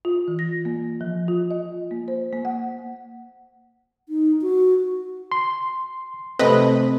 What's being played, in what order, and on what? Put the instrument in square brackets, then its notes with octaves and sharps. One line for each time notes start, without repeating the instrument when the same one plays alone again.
[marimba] F4
E3
A#6
A#3
F3
F4
D#5
A#3
C5
A#3
F#5
[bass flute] D#4
F#4
[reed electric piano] C6
[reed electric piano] C3 A3 C4 [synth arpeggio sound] B4 D#5